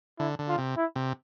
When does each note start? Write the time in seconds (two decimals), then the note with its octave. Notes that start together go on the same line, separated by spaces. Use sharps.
0.19 D3 E4
0.39 D3
0.48 F4
0.58 C3
0.77 E4
0.96 C3